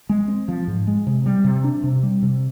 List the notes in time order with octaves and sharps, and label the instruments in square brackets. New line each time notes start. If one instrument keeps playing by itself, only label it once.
[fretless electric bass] G#3
C4
F3
G#2
G#3
C3
G3
C3
D4
C3
G3
C3